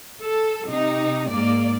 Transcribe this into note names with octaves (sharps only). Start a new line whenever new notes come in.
A4
C3 D#4
G#2 A#3 D5